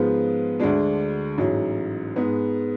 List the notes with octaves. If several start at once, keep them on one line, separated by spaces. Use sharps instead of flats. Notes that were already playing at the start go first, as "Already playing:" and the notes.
Already playing: G#2 F3 G#3 B3 F4
D2 D3 G#3 D4
A1 G#2 F#3
G#2 G#3 B3